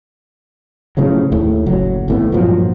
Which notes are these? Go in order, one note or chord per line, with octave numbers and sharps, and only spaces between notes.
A2 C#3 F3 F#3
D#2 A2
F#1 F#3
G#1 A2 B3
G2 A#2 F3 F#3